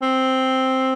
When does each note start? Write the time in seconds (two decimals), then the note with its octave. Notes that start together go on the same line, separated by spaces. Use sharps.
0.02 C4